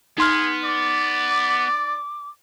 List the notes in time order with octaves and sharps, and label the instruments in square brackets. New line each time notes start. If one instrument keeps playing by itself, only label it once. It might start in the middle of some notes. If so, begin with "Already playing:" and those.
[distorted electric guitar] B3 [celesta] D#4 C6 F6 [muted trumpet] G#4
[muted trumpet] D5 [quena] D6